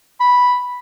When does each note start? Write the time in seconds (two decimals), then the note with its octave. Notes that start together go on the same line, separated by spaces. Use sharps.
0.20 B5